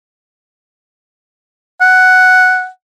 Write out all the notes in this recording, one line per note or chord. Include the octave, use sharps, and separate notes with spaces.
F#5